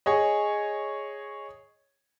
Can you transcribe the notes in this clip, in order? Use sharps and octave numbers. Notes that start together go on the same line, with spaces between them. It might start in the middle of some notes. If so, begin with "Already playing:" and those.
G#4 C#5 D#5